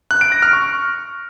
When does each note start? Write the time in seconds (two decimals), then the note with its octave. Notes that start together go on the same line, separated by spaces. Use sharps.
0.11 F#6
0.21 D7
0.32 A#6
0.42 F6
0.53 C#6